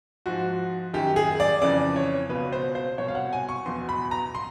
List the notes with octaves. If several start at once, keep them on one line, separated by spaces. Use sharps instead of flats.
G#2 F3 F#4
F#2 D#3 G4
G#4
D5
F2 C#3 E3 D5
C#5
C#2 B2 B4
C5
C5
C2 B2 C#5
F5
F#5
G#5
C#6
E2 B2 C6
B5
A#5
C6